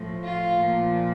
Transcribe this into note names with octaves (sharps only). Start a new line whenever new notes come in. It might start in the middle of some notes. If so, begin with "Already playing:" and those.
Already playing: A2 F3
F4
A#2 F3